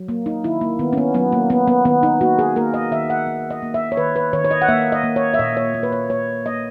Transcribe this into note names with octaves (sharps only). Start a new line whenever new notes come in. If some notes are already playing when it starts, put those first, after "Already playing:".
Already playing: F#3
A#3
D#4
D#3 E4
A#3
D#3 B3
C#4
B3
F#3 B3
A#3
A#3 B3
B3
D#3 B3
D#4
A#3 F#4
G#4
A#3 A#4
D#5
D#3 E5
F#5
A#3
D#5
A#3
E5
C#5
D#3 B4
B4
D#3 C#5
C#5
D#5
F#5
A#3 E5
D#5
A#3
C#5
E5
A#2 D#5
C#5
A#3
B4
C#5
A#3 C#5
A#3 D#5